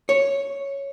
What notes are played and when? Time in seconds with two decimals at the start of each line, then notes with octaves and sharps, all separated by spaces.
0.09 C#5